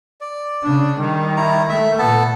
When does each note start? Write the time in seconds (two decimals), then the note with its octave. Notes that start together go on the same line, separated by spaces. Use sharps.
0.21 D5
0.63 C#3 D4
1.00 D#3 G3
1.37 E4 A#5
1.69 A3 E5
1.99 A#2 B3 A4 A5